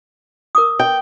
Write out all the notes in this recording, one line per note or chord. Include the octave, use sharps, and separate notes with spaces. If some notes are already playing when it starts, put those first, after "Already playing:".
A#4 D6 D#6
G5